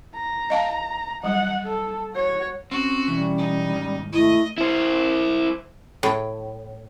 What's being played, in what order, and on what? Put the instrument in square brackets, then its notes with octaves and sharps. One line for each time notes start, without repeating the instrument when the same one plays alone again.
[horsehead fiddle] A#5
[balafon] D#5 F5 A5
[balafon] F#3 G3 [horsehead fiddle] F#5
[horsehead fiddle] A4
F#4 C#5
[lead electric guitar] C4 [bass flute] C#4 [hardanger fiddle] F#4
[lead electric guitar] B1 E3 [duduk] G3
[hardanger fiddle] D#4
[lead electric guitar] D#2 G#2
[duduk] A3 [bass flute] E4 [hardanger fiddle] D#5
[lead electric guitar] E4 C5
[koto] A2